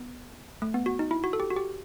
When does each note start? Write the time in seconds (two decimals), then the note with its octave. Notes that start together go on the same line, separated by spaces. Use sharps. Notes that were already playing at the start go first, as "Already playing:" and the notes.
Already playing: B3
0.62 A3
0.74 B3
0.86 F#4
0.99 D#4
1.11 E4
1.24 F#4
1.33 A4
1.40 G4
1.50 F#4
1.56 G4